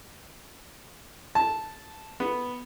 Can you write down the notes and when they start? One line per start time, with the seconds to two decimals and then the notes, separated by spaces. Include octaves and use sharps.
1.35 A5
2.20 B3